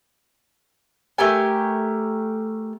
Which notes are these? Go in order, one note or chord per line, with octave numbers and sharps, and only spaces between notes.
A3 G4 A#4 G#5